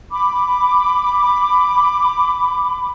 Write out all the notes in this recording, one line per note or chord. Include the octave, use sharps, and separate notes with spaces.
B5 D6